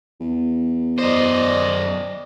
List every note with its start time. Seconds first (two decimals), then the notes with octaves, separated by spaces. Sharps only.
0.20 E2
0.99 F#2 C5 D5 D#5